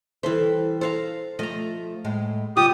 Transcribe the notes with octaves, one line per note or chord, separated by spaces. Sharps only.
E3 G3 A4 C5 E5
A4 C5 F5 A#5
F3 A3 D#5 A#5
A2 G#3
C#3 G3 F4 G4 D#6